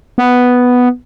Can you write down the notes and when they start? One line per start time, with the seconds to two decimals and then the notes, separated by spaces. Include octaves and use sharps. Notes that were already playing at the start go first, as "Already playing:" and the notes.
0.18 B3